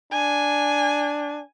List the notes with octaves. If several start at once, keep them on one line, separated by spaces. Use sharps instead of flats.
D4 G#5